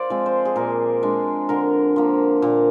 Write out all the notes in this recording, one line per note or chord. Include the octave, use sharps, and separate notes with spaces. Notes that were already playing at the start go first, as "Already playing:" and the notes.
Already playing: F4 C5 D5
F3 G#3 C4
C5
G#4
A#2 A#4
G#3 D4
D3 A#4
F3 A#3
A#2